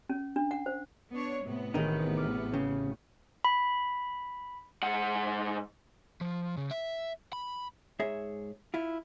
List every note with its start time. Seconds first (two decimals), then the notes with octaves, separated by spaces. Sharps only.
0.10 C#4
0.36 D4
0.51 F#5
0.66 C5
1.12 B3 D4 C#5
1.44 A2 C3 B3
1.74 A1 D#3 D#4 G#4 B4
2.17 D6 F6
2.54 C#3 G5
3.45 B5
4.82 G#2 F#5
6.21 F3
6.57 C#3
6.71 E5
7.33 B5
7.99 G#2 G#4 C#5 E5
8.74 E4 F4